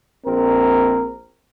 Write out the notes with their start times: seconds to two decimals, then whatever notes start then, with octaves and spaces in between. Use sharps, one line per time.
0.24 A#1 C4 A#4